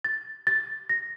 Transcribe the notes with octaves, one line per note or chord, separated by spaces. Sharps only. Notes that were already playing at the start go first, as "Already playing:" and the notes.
A6
A6
A#6